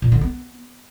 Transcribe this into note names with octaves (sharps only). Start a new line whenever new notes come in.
A#2
D3
B3